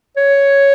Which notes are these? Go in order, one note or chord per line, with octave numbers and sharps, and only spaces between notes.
C#5